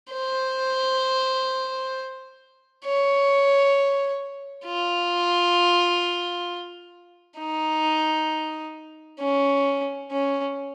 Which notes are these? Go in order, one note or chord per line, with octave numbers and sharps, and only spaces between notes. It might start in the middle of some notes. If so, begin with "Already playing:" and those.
C5
C#5
F4
D#4
C#4
C#4